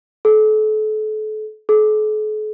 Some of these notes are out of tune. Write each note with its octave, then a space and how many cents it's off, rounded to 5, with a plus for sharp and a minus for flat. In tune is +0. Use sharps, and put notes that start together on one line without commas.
A4 -35
A4 -45